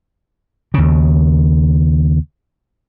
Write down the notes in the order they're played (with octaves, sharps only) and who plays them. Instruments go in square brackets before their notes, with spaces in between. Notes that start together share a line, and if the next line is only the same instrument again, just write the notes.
[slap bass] D#2 C#3